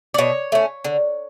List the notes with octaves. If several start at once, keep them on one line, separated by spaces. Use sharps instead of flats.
D5
B2 C#5
A3 C#4
D3